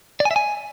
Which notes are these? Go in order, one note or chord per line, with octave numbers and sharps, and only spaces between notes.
D5
G#5
E5
G#5